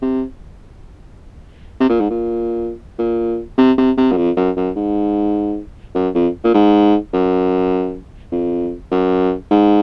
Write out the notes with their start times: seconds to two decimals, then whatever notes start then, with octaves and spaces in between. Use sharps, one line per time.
0.02 C3
1.80 C3
1.89 A#2
2.00 G#2
2.10 A#2
2.98 A#2
3.58 C3
3.78 C3
3.97 C3
4.12 F#2
4.17 F2
4.37 F#2
4.57 F#2
4.76 G#2
5.95 F#2
6.14 F2
6.44 A#2
6.54 G#2
7.14 F#2
8.32 F2
8.91 F#2
9.51 G#2